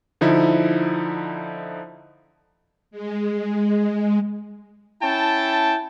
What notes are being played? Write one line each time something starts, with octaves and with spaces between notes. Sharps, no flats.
D3 F3 D#4 E4
G#3
C#4 E4 G5 A5